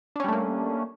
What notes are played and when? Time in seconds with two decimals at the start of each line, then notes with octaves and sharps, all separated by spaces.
0.16 D4
0.20 C#4
0.24 G3
0.28 A3
0.33 A#3